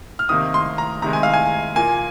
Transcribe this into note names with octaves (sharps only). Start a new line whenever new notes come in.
F6
C3 D#3 A#3 D#6
C6
A#5
C3 D#3 G#3 A#5
G#5
F5
G#5
A#2 A#3 G#5